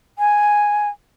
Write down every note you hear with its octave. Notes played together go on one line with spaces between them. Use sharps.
G#5